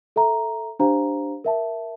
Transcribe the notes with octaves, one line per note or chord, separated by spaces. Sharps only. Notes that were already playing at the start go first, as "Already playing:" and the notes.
A4 E5 A#5
D4 G4 C5 F5 A#5
A#4 E5 A5